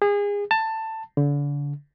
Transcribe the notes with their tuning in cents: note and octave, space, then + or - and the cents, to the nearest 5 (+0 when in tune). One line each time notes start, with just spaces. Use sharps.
G#4 -30
A5 +15
D3 -35